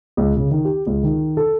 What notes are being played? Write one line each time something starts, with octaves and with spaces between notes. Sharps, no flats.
C#2
C#3
D#3
G4
C#2
D#3
A4